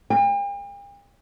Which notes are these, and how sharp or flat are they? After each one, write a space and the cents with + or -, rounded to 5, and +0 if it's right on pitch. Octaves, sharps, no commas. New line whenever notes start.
G5 +45